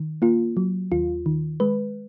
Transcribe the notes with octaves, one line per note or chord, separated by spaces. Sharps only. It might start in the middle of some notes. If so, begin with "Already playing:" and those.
Already playing: D#3
A#3 F4
F#3
D#2 F4
D#3
G#3 B4